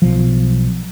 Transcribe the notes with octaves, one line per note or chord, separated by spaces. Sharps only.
B1 F3